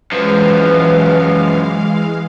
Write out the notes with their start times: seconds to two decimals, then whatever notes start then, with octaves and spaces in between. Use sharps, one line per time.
0.12 F#2 E3 F3 G#3 B4 F5